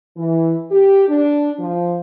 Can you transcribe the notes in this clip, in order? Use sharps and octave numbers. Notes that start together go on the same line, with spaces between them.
E3
G4
D4
F3